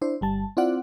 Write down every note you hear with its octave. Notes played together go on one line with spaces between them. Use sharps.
D4 E4 C5
G1 G3 A5
C4 E4 F4 D5 F#5